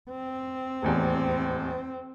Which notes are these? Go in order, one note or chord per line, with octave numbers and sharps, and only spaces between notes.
C4
D#1 A1 E2